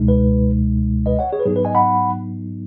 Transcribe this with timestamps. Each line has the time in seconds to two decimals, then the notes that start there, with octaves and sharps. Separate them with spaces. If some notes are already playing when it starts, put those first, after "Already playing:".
Already playing: C#2 B2 G#3 D#4
0.08 B4
1.06 B4 D#5
1.19 C#5 F#5
1.33 G#4 C#5
1.40 B4
1.46 G#2 F#3 B3 D#4 G#4
1.56 B4
1.65 D#5 G#5
1.75 F#5 B5